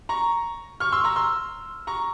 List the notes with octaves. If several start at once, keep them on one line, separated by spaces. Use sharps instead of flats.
A#5 C#6
C#6 F6
C6 E6
A#5 C#6
C6 E6
A#5 C#6